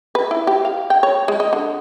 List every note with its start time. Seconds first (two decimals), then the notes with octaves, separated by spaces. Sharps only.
0.15 B4
0.31 E4
0.47 G4
0.65 F5
0.90 G5
1.03 C#5
1.28 G#3
1.40 D#5
1.53 D3